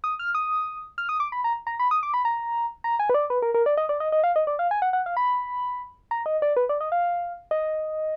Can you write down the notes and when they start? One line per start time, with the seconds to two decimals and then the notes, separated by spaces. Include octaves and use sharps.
0.04 D#6
0.19 F6
0.35 D#6
0.98 F6
1.09 D#6
1.20 D6
1.32 B5
1.44 A#5
1.67 A#5
1.80 B5
1.91 D#6
2.03 D6
2.14 B5
2.25 A#5
2.84 A#5
3.00 G#5
3.10 B4
3.14 D5
3.30 B4
3.42 A#4
3.54 A#4
3.66 D5
3.77 D#5
3.89 D5
4.00 D#5
4.12 D#5
4.24 F5
4.36 D#5
4.47 D5
4.59 F5
4.71 G#5
4.82 F#5
4.93 F#5
5.06 F5
5.17 B5
6.11 A#5
6.26 D#5
6.42 D5
6.57 B4
6.69 D5
6.81 D#5
6.92 F5
7.51 D#5